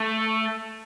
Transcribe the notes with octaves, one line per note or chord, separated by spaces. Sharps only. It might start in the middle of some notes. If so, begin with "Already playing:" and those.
Already playing: A3